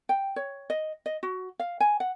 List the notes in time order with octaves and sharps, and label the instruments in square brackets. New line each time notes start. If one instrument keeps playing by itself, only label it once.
[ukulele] G5
C#5
D#5
D#5
F#4
F5
G#5
F#5